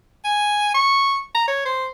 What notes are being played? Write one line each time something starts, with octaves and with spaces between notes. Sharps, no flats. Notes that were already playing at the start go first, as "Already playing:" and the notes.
G#5
C#6
A#5
C#5
C5